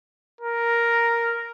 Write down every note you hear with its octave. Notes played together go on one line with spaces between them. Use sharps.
A#4